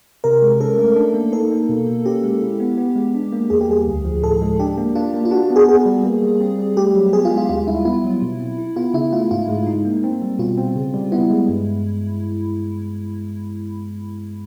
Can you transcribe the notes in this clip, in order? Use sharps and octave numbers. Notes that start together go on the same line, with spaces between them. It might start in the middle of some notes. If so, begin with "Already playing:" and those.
C3 A#4
G#3
C#4 A4
A3
D4
A#3
D#4 A4
A#3
B2
A#3
C#4 G4
G#3
E4
B3
B3
G#3
D4
A#3
E2 G#4
G4
G3 G#4
D2
F3
A2 A4
G#3
D4 G4
A#3
D4 F4
A#3
F4
D4 F#4
B3
G#4
B3 G#4
G3
A#3
G3
C4
G3
A3 G4
F#3
B3 G#4
F4
G#3
F4
D#2 F4
G3 E4
B3 E4
F#3
B2
C4
E4
B3 F4
C#3 E4
A3 F4
G#2 F4
G#3
D#4
A#3
C4
G3
B2 F4
C4
C#3
G3
B3 E4
G#3
G2